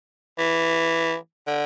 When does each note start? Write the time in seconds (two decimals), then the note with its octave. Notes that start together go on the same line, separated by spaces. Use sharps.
0.38 E3
1.47 D3